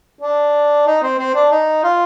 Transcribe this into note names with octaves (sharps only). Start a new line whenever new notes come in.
D4
D#4
C4
C4
D4
D#4
F4